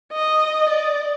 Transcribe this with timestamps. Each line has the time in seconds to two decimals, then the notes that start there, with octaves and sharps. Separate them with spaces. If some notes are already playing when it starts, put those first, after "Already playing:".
0.12 D#5
0.69 D5